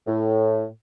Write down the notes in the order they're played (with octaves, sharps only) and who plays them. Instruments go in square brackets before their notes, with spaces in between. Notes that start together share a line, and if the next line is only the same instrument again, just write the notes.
[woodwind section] A2